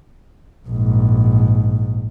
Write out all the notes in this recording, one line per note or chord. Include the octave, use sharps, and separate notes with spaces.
A#1 G#2